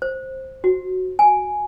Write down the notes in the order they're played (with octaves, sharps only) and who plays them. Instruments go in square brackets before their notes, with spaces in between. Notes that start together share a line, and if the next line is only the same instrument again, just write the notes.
[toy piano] C5
F#4
G#5